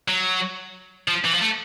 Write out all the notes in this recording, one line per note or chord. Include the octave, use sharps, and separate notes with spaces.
F#3
F3
E3
F3
A3